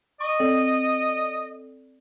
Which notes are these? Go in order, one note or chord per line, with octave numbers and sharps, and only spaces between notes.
D#5 C#6
C4 A4 D5